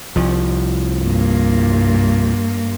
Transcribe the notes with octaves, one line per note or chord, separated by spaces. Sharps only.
C2 F3
G2 A#3